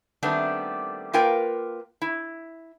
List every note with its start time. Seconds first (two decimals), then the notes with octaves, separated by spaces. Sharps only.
0.23 D#3 G3 A3 B3 C4 D4
1.13 A#3 F4 A#4 B4 G5
2.02 E4